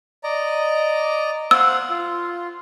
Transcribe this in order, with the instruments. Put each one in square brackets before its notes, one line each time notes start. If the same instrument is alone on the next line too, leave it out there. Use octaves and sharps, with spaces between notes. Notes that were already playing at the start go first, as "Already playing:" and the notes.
[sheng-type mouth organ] D5 D#5 A#5
[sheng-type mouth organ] C5 F5 F#5 [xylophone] E6
[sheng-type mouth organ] F4